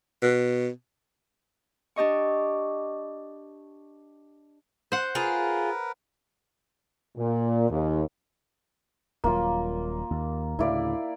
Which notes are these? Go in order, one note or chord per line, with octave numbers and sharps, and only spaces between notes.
B2
D4 G4 D#5 C#6
C5 F#5
F4 G#4 A#4 B4
A#2
D#2
D#1 F#3 A#3 F4
D#2
D2 A2 C#3 E4 D5 F5